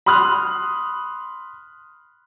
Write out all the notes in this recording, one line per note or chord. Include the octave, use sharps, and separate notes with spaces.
B5 C6 D#6 F6 F#6